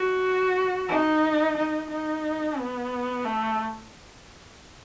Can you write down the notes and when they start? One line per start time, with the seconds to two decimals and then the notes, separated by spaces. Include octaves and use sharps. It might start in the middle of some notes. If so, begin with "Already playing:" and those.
Already playing: F#4
0.89 D#4
1.57 D#4
1.90 D#4
2.58 B3
3.25 A3